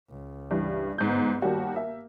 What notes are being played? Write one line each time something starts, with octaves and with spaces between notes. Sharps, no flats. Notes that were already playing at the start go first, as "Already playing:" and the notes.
C#2
G2 E3
G1 G#2 B3 G6
D#2 G3 A#3 F#4
E5